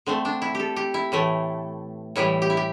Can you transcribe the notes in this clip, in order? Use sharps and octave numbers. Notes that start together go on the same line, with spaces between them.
D3 A3 C4
D4
E4
G4 A4
G4
E4
A2 E3 A3
A2 E3 G3 E4
G4
E4
G4